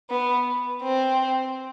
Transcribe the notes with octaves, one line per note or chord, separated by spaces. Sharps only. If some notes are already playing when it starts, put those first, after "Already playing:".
B3
C4